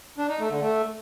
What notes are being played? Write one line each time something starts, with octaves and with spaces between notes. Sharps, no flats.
D4
D#4
A3
D3
A3